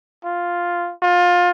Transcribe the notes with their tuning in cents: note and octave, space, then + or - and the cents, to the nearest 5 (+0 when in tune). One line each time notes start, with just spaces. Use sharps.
F4 +0
F4 +25